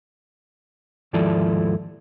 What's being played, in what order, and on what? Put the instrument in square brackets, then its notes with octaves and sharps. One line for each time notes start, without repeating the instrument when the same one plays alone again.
[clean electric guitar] D#2 G#2 F3 E4 A4 D5